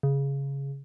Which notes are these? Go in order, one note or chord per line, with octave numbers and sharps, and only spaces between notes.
C#3